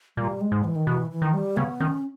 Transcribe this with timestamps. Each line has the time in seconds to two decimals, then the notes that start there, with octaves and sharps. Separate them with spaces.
0.17 A#2 G3
0.41 G#3
0.52 G#2
0.64 E3
0.76 D#3
0.87 B2 E3
1.11 E3
1.22 D#3
1.34 G3
1.57 C#3 B3
1.80 D#3 C#4